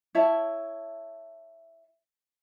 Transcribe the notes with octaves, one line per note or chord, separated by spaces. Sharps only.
E4 C#5 E5 A5